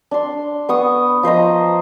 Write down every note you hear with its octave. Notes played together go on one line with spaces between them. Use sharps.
D4 C6
B3 C#6 D#6
F3 C5 D#5 A#5